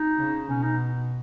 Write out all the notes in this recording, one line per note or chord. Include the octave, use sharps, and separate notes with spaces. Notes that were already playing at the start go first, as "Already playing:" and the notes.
Already playing: D#4
C#3
B2 C#4
D#4